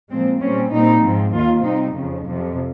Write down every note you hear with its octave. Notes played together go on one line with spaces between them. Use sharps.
A#2 F3 G#3 C4
A#2 G3 C4 C#4
A#2 G3 C4 D#4
G#2 F3 G#3 C4
D#2 D#3 A#3 F4
C3 G3 C4 D#4
F2 C#3 F3
F2 C3 F3